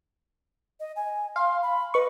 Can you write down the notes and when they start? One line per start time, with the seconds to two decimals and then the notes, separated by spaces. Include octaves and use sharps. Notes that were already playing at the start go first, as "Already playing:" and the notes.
0.80 D#5
0.96 G#5
1.36 F5 C6
1.62 B5
1.94 B4 D#5 C#6